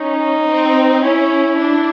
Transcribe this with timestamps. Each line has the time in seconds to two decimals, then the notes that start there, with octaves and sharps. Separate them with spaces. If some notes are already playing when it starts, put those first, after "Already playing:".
Already playing: C#4 D#4
0.48 C4
1.02 C#4 E4
1.57 D4